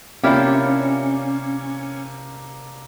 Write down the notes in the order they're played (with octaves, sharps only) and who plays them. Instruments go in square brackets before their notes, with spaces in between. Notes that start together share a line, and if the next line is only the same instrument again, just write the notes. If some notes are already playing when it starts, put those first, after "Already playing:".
[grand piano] C3 A#3 D4 [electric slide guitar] C#4 [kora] E4 F4 G4